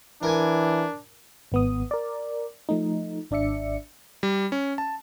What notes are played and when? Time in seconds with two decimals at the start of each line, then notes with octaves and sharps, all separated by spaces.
0.23 E3 D4 A#4 G#5
1.52 G#1 B3 D#6
1.91 A#4 D5
2.69 F3 A3 D#4
3.31 G#1 D4 D5 E5 C#7
4.23 G3
4.52 C#4
4.78 A5